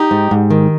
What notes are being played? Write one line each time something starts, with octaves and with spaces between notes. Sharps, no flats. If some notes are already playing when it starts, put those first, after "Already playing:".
Already playing: D#4 G4
G#2
G#2
D#3